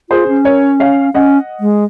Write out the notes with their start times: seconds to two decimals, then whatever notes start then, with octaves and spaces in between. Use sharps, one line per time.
0.10 F4 G#4 C5
0.28 C#4
0.44 A#4 C#5
0.80 C#5 F5
1.14 C#4 D#5 F#5
1.60 G#3